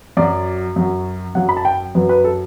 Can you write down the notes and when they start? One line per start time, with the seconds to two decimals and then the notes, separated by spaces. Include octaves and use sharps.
0.17 F#2 F#3 D5
0.76 F#2 F#3
1.35 F#2 F#3 F#5
1.49 B5
1.57 A5
1.65 G5
1.95 F#2 F#3 B4
2.09 B4
2.24 A4